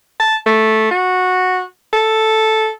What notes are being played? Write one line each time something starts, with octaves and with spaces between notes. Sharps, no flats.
A5
A3
F#4
A4